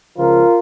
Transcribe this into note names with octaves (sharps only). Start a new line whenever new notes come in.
C#2 C#3 F3 F4 A#4